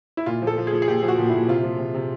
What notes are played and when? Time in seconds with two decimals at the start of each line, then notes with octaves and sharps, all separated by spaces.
0.17 E4
0.26 A#2 F4
0.42 F3
0.47 A4
0.58 F3
0.67 G#4
0.73 F3
0.82 G#4
0.88 A#2 G4
1.03 F3
1.08 F#4
1.18 A#2
1.29 A#2 E4
1.48 C3 F4
1.63 F3
1.79 C3
1.94 C3